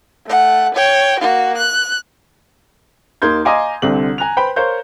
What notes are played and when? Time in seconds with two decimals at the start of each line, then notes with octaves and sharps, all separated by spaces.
0.27 A3 F#5
0.74 C#5 G5
1.20 A#3 F#4
1.57 F#6
3.22 D#2 A#3 D#4 C6 G6 G#6
3.45 D#5 F5 G#5 A#5 C6 D6
3.82 C2 D3 C4 A4 F#7
4.18 G#5 A#5 F#6 F7
4.37 B4 C5 G5 B5
4.56 A#4 C5 C#5 F5 G6